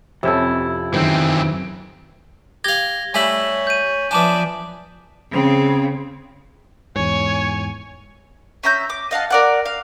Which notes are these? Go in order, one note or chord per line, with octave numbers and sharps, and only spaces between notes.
F2 C3 C#4 E4 A4
F#2 D#3 E3 C4 C5
G4 F5 G#6 A#6 G7
G3 A3 E4 C#5 G#5 B6 F#7
G6 D#7
F3 B3 D4 D5 E5 G#5 A5 D6
C#3 C4
E2 G#2 C#5 G#5
C#4 E5 A#5 G6
D6
D#5 F5 F#5 A5
A#4 D5 F#5
F5